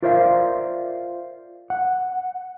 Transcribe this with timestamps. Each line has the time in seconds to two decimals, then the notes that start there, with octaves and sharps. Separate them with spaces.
0.03 F4 A#4 C5 D5 E5 F5
1.70 F#5